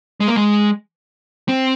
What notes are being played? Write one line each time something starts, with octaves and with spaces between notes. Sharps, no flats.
G#3
A#3
G#3
C4